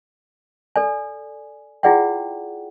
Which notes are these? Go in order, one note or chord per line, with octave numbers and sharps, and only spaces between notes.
A4 D5 G#5
E4 F4 G#4 D5 F#5 G5